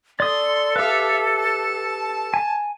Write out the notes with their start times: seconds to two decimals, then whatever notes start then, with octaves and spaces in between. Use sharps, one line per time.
0.20 A4 D5 C6 D#6
0.76 G4 B4 E5 F5
1.37 A5
2.34 G#5